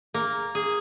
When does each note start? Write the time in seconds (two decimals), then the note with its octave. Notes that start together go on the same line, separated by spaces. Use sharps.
0.14 A#3
0.55 G#4